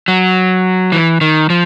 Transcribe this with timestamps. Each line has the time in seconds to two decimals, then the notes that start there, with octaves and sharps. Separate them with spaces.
0.08 F#3
0.92 E3
1.21 D#3
1.50 F3